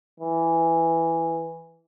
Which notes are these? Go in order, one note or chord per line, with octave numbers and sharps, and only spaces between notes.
E3